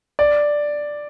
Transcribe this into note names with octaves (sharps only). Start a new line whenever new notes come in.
D5